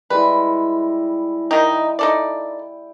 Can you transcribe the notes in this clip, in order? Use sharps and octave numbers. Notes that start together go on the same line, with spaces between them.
G3 G#3 E4 B4
D#3 D#4 G5
D#4 A4 D5